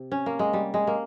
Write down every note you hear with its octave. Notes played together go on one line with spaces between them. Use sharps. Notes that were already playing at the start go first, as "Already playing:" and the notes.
Already playing: C3
C#4
A#3
G#3
G3
G#3
A#3